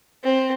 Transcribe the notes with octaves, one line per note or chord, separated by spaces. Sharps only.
C4